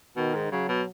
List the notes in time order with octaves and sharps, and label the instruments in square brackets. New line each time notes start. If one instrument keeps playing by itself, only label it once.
[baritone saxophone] B2 [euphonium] D#3
[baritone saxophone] G#2
[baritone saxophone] C#3 [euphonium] F#3
[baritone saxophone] B2